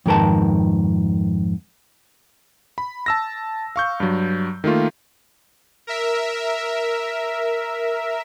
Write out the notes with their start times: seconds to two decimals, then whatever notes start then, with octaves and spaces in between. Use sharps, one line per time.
0.06 F2 G#2 D#3 A#4 B4 A5
2.78 B5
3.06 A5 E6 A#6
3.76 F5 C#6 G6
4.00 G2 F#3
4.64 D#3 A3 A#3 F4
5.87 A#4 E5